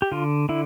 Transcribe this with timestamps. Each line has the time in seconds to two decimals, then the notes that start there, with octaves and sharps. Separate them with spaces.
0.02 G4
0.12 D3 F4
0.49 D3 E4